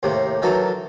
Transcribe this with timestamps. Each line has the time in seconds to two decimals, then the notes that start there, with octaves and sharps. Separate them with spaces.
0.03 D#2 A2 C3
0.42 D#3 E3 F#3 A4